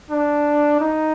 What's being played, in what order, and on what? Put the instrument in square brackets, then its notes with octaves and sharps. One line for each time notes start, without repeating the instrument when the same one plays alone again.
[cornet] D4
D#4